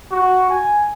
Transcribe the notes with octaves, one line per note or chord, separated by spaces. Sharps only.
F#4
G#5